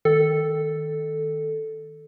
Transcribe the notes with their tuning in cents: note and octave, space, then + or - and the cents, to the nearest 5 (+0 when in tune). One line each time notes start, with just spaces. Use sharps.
D#3 +0 A4 +0